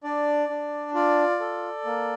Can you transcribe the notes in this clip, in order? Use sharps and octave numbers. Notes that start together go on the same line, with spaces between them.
D4 D5
D4
F4 D5
A4
A#3